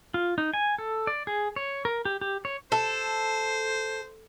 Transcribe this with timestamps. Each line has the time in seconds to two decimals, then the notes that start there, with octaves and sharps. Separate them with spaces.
0.14 F4
0.38 D#4
0.54 G#5
0.78 A4
1.07 D5
1.27 G#4
1.56 C#5
1.85 A#4
2.05 G4
2.21 G4
2.45 C#5
2.72 A4 C5